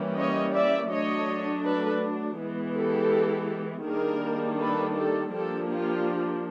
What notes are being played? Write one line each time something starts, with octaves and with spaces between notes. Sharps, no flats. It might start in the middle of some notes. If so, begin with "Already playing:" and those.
Already playing: E3 G3 A#3 C#4
C#5 D#5
D5 E5
F#3 A3 D4 C#5 D#5
A4 B4
E3 G#3 B3
G4 A4
D#3 G3 A#3 D4 G#4 A#4
A4 B4
G4 A4
F3 A#3 D4 G4 A4
F4 G4